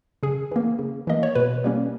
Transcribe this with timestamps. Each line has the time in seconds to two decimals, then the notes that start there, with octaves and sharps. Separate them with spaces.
0.23 C#3 G#4
0.51 E3 A#3
0.79 C#3
1.07 E3 A#3 D#5
1.23 C#5
1.35 B2 B4
1.64 G3 A#3 C#4